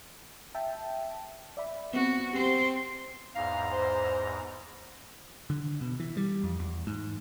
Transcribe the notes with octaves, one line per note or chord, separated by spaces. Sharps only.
E5 G5 A5
D5 E5 B5
B3 C4 F#4
C4 G4 C5
E2 G#2 F5 A#5
C5
D3
B2
E3
G3
F2
E2
G#2